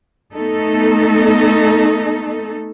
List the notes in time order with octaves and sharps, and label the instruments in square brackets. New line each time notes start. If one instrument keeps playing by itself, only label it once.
[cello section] A3 B3 D#4 A4